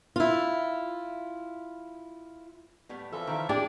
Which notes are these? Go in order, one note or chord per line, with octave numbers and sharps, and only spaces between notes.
E4 F4
A2 G3 B3
E3 F3 A4 E5
D#3 E4 F5
D4 E4 G4 G#4